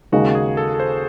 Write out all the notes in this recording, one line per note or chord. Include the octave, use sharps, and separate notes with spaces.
D#2 C#3 G#3 D#4 F#4
G#4
A4
A4
C5